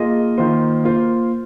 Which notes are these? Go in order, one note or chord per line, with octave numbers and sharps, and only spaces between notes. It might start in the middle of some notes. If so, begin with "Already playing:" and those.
Already playing: A#3 F4 G#4 D#5
D#3 A#3 F4 C5
A#3 F4 C5